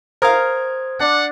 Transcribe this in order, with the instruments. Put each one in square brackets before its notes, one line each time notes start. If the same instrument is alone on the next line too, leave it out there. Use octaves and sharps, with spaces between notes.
[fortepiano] A#4 F5 [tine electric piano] C5 D#6 G#6
[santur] D4 [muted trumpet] F#5